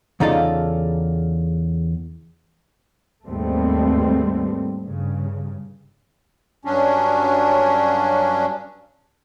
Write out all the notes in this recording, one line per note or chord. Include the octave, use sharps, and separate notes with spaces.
E2 C#3 D#4 F4 A4 D5
D#2 G#2 G3 A3 B3 C4
G2 C#3
G2 F#3 C#4 D4